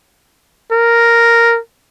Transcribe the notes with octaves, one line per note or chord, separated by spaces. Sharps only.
A#4